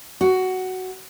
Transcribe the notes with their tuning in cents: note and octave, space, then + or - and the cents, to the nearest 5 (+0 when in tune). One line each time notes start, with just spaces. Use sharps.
F#4 +10